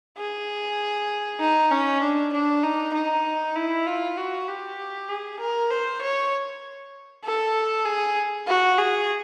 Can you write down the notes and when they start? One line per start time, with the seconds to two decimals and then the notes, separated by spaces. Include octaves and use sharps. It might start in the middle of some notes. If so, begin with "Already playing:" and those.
0.17 G#4
1.40 D#4
1.71 C#4
2.02 D4
2.33 D4
2.63 D#4
2.94 D#4
3.56 E4
3.86 F4
4.17 F#4
4.48 G4
5.09 G#4
5.40 A#4
5.71 C5
6.01 C#5
7.24 A4
7.85 G#4
8.47 F#4
8.78 G#4